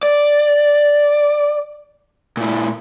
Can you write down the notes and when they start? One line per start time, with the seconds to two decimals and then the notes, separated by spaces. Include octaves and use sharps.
0.03 D5
2.37 A#2 E4